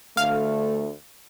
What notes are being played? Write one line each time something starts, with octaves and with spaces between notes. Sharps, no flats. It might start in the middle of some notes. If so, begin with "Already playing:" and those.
D2 D3 A3 F5